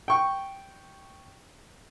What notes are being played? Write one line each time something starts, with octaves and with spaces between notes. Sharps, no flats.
G5 C#6